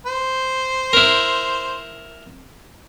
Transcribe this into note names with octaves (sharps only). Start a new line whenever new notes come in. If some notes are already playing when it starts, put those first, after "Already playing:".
C5
E4 A#4